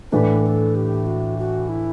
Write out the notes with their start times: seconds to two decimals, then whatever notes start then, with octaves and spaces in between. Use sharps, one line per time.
0.11 A2 E3 A3 D4 B4
0.43 B4
0.46 A4
0.75 G4
1.06 F#4
1.39 F#4
1.69 E4